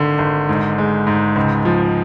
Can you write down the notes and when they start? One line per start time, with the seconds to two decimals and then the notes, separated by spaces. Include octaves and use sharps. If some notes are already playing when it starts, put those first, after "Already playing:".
Already playing: G#1 D3
0.18 G#1
0.49 G#2
0.78 G#3
1.07 G#2
1.36 C#2
1.65 F3